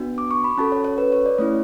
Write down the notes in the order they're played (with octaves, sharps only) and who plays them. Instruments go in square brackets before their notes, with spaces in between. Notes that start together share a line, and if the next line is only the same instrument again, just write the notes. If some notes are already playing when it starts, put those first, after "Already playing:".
Already playing: [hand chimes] B3 D4 F#4
D6
C#6
B5
C#4 F#4 A4 A5
C#5
C#5
B4
C#5
D5
A3 C#4 E4 C#5